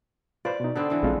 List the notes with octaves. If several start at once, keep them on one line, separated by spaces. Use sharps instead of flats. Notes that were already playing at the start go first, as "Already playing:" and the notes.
F4 B4 C5 D5
B2 D#4
D3 B3 C4 A4 D5
D3 E3
A#1 G#3 C4 F4 A4